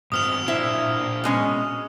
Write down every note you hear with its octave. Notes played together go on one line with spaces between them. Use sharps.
G2 C4 F#4 D#6 F6 F7
A#2 D4 E4 C5 E5
B2 G#3 C#4